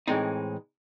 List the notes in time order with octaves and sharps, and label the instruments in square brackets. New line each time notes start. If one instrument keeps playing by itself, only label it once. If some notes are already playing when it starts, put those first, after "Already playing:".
[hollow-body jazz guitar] A2 E3 G#3 C4 D#4